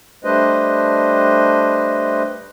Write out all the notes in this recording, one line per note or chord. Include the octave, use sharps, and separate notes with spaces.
G3 A3 D4 B4 C5 D#5